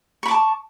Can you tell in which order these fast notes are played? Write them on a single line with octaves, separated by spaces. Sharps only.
C#6 B5 D6 A5